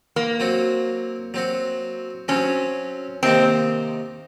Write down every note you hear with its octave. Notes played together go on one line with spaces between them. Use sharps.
A#3
F#3 C4 F#4
F#3 C4 F#4
F#3 C4 C#4 F#4
C3 D#3 A#3 C4 D#4